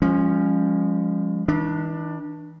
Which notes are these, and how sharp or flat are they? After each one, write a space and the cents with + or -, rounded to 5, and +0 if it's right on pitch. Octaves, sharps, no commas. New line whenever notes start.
F3 +0 G#3 -35 C#4 +5
E3 -40 D4 +20